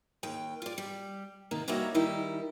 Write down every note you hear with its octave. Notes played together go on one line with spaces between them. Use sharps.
D#2 G5
F4 D5
G3
C3 D#3 A#3
G3 A#3 D#4 F#4 C#5 E5
D#3 G3 D#4 E4